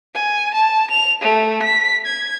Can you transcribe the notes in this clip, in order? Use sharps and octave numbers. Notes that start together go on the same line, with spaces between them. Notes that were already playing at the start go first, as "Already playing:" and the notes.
G#5
A5
F7
A3
B6
G#6